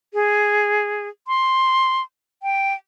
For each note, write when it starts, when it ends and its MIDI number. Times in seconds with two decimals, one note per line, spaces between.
0.14 1.08 68
1.27 2.01 84
2.43 2.74 79